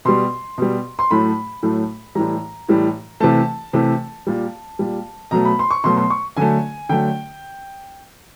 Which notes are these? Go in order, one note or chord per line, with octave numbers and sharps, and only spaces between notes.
B2 G3 C6
B2 G3
C6
A2 F#3 A3 B5
A2 F#3 A3
A2 E3 G3 A#5
A2 E3 G3
C3 E3 A3 A5
C3 E3 A3
A#2 G3
A#2 G3
B2 F#3 A3 A#5
B5
C6
C#6
B2 F#3 A3 C6
C6
C#6
D3 F#3 A3 G#5
D3 F#3 A3 G5